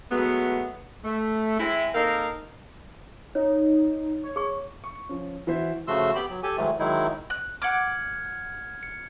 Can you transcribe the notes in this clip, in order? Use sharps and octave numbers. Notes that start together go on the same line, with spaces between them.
F#3 G#3 A3 B3
A3
G#3 C4 E4
A#3 C4 D#4 A4 A#4 F5
D#4 C#5
C#5
G#4 C#6
C#6
F3 C#4
E3 E4 F#4 C5 E5
C#3 F3 A3 F#4 C6 E6
B3 G4 G5 B5
F#3
G4 A4 G#5
G#2 D#3 E3 F#3 G#3 A3
D#3 F#3 G#3 D#4 E4
F#6
F#5 D6 F6 G#6 C#7
C#7